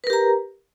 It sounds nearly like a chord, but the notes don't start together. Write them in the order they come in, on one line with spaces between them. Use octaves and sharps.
B4 A#4 G4 A#5